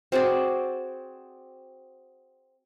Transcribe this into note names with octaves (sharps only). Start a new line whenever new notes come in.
C4 F#4 G#4 D5